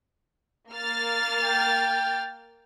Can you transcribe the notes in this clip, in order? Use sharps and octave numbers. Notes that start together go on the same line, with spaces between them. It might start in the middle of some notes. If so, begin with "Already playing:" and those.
A#3 F6 A6
G5